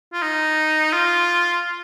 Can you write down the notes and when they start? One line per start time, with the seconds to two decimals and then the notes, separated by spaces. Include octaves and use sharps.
0.13 F4
0.22 D#4
0.92 F4